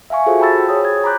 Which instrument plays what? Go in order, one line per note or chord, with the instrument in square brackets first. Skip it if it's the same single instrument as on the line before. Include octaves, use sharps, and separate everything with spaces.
[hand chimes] E5 F5 G#5 C#6
F4 F#4 G#4 A4 C5
G5 A5 B5 E6 A6
G#4 C#5 D#6
G#6
A#5 B5 D6 F#6 G6